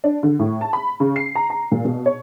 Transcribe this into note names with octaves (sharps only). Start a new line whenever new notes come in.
D4
D3
A2
A5
B5
C#3
C7
A#5
A#5
A#2
B2
C#5